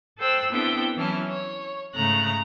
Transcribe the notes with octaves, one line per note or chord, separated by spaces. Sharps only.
A4 C5 G5 E6 F#6
B3 C4 D4 E4 A4 G5
E3 F#3 C#4 E4 A5 F6
C#5
G#2 C#3 A3 A#5 F#6